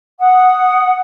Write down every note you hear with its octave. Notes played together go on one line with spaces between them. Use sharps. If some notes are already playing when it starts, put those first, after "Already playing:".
F#5 D#6